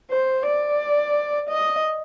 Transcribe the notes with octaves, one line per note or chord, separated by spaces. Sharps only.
C5
D5
D#5